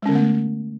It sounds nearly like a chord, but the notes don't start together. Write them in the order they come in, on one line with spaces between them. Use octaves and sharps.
G#3 C#4 D3 B3 A3